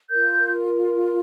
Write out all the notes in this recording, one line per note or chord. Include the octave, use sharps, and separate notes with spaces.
F4 A#4 G6